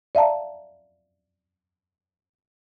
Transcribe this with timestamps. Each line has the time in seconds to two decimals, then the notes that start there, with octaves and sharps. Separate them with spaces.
0.15 D5 E5 F5 A5 A#5